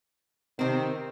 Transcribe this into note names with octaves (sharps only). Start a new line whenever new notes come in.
C3 D#3 C4